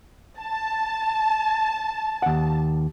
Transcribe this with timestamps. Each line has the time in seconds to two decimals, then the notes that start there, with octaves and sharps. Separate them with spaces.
0.39 A5
2.22 D#2 F#5